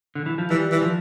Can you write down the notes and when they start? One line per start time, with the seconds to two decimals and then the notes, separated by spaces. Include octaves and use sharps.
0.15 D3
0.26 E3
0.38 F3
0.50 E3 G3
0.71 E3
0.82 F3